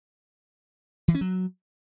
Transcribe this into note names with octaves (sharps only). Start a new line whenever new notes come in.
E3
C#4
F#3